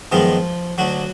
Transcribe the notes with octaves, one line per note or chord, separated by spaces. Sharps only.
F#2 D#3 F3 G#3 B3 F4
D2 D3 F#3 F#4